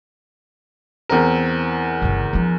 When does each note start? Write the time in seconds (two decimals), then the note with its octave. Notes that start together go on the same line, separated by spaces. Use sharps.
1.09 E2 C4 A#4
2.02 G1 C#3
2.33 F3 D4